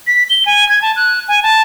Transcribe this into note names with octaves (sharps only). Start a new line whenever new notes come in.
B6
G7
G#5
G#6
A5
F#6
G#5
A5